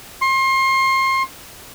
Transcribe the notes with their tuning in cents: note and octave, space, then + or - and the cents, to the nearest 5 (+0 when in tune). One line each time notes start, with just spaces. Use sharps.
C6 +35